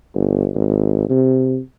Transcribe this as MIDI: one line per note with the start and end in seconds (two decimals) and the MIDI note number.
0.15 0.50 31
0.55 1.05 32
1.10 1.59 48